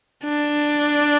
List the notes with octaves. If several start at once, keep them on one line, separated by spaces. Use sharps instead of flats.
D4